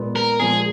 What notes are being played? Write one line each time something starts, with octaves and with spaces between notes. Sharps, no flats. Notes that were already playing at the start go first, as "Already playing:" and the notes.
Already playing: A#2 G#3 B3
A#4
A#2 F3 G#3 G#4